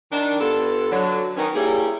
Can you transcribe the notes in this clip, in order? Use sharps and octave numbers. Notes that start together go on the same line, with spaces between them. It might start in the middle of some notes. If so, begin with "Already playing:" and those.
D#3 D4
G2 B3 F4 A4
D3 F#3
D#3 B3 C#4
G3 A#3 C#4 E4 G4 G#4